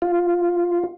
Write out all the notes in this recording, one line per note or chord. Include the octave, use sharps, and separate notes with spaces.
F4